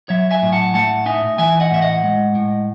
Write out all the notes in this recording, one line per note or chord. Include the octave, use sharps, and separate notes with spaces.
F#3 C#5 E5
E5 G#5
A2
F#5 A5
A3 F#5 A5
D#4 E5 G#5
E3 E5 G#5
D#5 F#5
A2 E5
D#5 F#5
G#3
A2